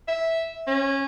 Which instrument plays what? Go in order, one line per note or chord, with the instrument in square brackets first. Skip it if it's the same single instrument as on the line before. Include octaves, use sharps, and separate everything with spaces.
[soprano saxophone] E5
C#4